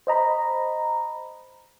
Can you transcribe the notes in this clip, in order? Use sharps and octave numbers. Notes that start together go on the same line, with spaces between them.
C5 D#5 A#5 B5